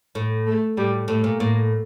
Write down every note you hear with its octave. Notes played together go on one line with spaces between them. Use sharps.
A2
A3
A2 G3
A2 A3
A#2
A2 A#3